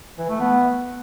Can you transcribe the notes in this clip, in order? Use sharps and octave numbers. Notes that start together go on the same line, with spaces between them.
E3
A3
B3